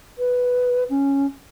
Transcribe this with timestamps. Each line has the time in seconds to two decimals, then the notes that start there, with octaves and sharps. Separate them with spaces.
0.19 B4
0.90 C#4